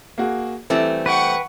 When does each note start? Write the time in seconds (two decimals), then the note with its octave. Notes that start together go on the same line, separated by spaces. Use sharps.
0.18 A#3 F#4 G#4
0.70 E3 G3 A3 C4
1.06 B4 F#5 G5 C#6